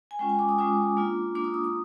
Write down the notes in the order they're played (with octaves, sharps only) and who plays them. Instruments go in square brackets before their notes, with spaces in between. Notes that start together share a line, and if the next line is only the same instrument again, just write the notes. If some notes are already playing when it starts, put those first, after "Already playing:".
[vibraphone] G#5
G#3 C#4 F4 G5
G#5
D6
D#6
G#3 C#4 F4 D6
A#3 D4 F4
A#3 D4 F4 D6
D#6
E6
D#6